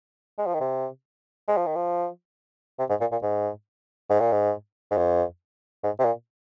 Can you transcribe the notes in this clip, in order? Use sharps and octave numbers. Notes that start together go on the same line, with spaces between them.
G#3
F3
D#3
C3
G#3
F3
D#3
F3
C3
G#2
A#2
A#2
G#2
G#2
A#2
G#2
G#2
F2
G#2
C3
A#2